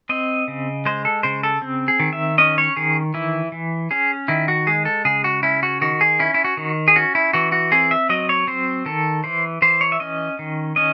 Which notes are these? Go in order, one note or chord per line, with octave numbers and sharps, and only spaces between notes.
C4 D#5
C#3
G#3 C5
A4
C#3 C5
A4
C4
G#4
D#3
E5
C#4 D#5
C#5
D#3 G#4
E3 E4
E3
C#4 G#4
D#3 E4
F#4
G#3 G#4
A4
C#3 G#4
F#4
C#4 E4
F#4
D#3 F#4
G#4
C#4 E4
E4
F#4
D#3
G#4
C#4 F#4
E4
E3 F#4
F#4
C4 G#4
E5
F#3 D#5
C#5
C4 C5
D#3 A4
E3 C5
E3 C5
C#5
E5
C#4 D#5
D#3
C#4 D#5